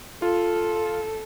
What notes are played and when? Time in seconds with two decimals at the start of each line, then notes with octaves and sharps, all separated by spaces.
0.22 F4 A4